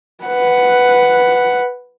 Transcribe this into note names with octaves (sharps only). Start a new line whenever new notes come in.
B4 F#5